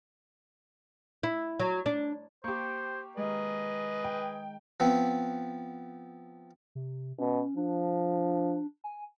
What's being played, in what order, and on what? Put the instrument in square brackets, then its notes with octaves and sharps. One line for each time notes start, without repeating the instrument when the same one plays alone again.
[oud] E4
F#3
D4
[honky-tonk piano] A#3 G4 [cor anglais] C5 [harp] C#6 D6
[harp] D#3 G#3 [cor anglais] G#4 [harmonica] B4 D#5
[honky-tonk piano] G5
[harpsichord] F3 B3 C4
[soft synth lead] C3
[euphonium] B2 [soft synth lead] C#4
[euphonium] F3 [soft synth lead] D4
[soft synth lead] G#5